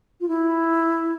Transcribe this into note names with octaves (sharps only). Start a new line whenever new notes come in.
F4
E4